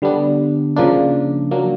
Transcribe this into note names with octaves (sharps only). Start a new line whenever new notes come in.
D3 G3 B3 D4
C#3 F3 A#3 D4
F#3 A#3 D4